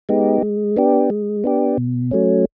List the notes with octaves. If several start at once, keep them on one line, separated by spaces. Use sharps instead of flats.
G#3 B3 D#4 G4
G#3
B3 D4 G4
G#3
B3 D4 G4
B2
F#3 A3 C#4